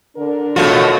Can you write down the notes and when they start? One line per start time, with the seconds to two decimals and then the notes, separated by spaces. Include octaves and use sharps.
0.16 D3 D4 A#4
0.56 B2 A3 F4 F#4 C#5